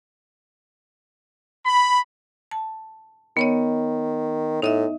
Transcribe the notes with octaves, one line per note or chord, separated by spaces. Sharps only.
B5
A5
D#3 B3 C#5 D#5
A2 D#4 D#5 E5